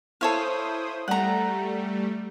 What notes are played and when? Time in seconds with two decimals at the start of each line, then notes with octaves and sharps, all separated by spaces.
0.21 E4 A4 C5 C#5 F5 D#6
1.08 G3 A3 F#5 A#5